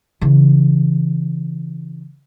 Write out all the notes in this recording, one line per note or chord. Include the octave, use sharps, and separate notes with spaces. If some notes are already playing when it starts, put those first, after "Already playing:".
C#3 E3